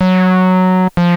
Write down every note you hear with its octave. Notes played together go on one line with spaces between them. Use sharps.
F#3
F3